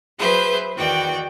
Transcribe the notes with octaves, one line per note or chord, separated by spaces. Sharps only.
F#3 G#4 B4 C5 E5 G6
E2 D#3 F#4 D5 G5